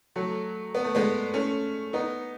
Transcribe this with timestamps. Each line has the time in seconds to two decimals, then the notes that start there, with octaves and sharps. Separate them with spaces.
0.16 F#3 A3
0.75 B3
0.84 A3
0.95 G#3 B3
1.34 A3 C#4
1.93 B3 D#4